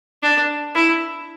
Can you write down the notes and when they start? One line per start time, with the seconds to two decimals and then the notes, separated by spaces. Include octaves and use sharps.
0.23 D4
0.75 E4